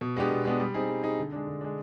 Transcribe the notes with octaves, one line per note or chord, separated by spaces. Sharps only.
B2
G#3 B3 D4 G4
B2
G#3 B3 D4 G4
G3
C4 D#4 G#4
G3
C4 D#4 G#4
D3
G#3 D4
D3
G#3 D4